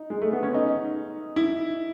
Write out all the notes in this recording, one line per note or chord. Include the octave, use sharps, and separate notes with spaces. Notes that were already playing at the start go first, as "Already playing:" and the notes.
Already playing: D#4
G#3
A3
B3
C#4
D#4
E4